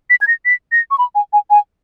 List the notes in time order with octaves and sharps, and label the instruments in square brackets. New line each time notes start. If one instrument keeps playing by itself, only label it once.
[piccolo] B6
G#6
A#6
B6
A#6
C#6
B5
G#5
G#5
G#5